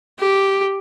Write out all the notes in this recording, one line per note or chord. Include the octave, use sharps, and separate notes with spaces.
G4